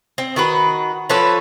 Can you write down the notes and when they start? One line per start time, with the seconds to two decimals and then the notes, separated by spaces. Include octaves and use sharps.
0.18 C4
0.36 D#3 F#4 B4
1.09 F3 A4 B4 C#5